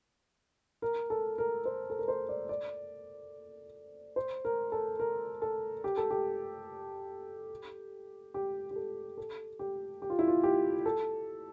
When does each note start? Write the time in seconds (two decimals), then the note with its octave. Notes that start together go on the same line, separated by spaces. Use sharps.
0.82 A#4
1.10 A4
1.38 A#4
1.65 C5
1.90 A4
1.99 A#4
2.08 C5
2.29 D5
2.49 D5
4.16 C5
4.45 A#4
4.72 A4
5.00 A#4
5.42 A4
5.84 G4
5.97 A4
6.11 G4
8.34 G4
8.71 G4
8.76 A4
9.18 A4
9.59 G4
10.02 G4
10.10 F4
10.19 E4
10.28 F4
10.44 G4
10.86 A4